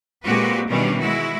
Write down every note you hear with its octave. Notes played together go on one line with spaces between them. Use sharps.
A#2 G#3 C4 F#4 G4 B4
B2 D#3 E3 G3 C#4 D4
G#3 E4 F#4